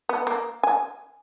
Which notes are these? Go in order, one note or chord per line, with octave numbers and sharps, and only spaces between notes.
B3
A#3
G#5